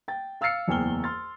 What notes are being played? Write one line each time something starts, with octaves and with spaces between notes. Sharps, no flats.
G5 A6
F5 E6 F6 A6 C7 C#7
F#1 E2 G5 G#5 F6 G7
C6 F6 A6